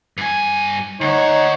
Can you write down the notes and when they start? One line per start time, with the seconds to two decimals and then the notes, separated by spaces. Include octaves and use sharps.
0.17 G2 G#5
1.01 D2 D#4 C5 C#5 F#5